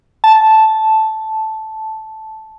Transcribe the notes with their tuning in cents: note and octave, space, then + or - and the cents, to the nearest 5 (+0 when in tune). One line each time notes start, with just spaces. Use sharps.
A5 -5